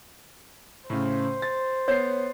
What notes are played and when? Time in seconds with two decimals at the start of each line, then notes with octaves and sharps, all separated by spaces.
0.90 A2 C#3 C5
1.42 A6
1.88 B3 C#5 C7